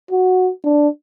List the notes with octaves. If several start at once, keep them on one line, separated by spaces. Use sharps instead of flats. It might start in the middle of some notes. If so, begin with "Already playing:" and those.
F#4
D4